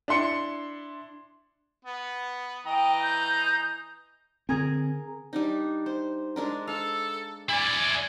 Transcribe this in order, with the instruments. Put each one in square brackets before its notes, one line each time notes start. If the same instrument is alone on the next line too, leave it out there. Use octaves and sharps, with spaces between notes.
[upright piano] D4 E4 C6 C#7
[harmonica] B3
[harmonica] E3 D#5 A#5 [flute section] G5
[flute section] G6
[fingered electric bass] D3 C4 [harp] G#4 A#4 G#5
[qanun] G3 D4 D#4
C5
G#3 D4 A#4
[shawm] A4 [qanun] F5
[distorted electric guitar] E4 D5 [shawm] G#5